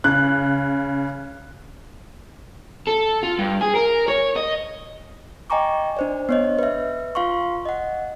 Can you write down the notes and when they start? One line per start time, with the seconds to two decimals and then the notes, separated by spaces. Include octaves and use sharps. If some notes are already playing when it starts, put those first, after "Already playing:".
0.04 C#3 F#6
2.87 A4
3.23 F4
3.39 G2
3.61 G#4
3.75 A#4
4.08 C#5
4.36 D#5
5.50 D#5 G5 G#5 A#5 C#6 D6
5.97 D4 C5 D5
6.29 B3 C#5 D#5
6.59 B4 E5
7.15 F4 F5 C6 C#6
7.66 D#5 F#5